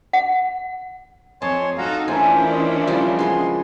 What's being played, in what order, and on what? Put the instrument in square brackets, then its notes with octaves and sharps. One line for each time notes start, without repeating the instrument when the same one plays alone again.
[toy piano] F#5
[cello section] F2 [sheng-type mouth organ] C#5 G#5 C6 [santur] D#5 [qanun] A5
[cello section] D#4 A4 [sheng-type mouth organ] F#4 F5 A#5
[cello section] E3 C#4 D4 [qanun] A3 [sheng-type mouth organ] F4 C5 [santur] A#4 G#5
[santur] D#5
[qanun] C#3 F3 G3
[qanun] G#3 G#4 [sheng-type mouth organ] B3 C6